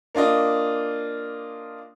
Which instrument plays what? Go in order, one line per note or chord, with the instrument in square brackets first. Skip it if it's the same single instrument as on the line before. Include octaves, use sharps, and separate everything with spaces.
[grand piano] A#3 D4 F4 D#5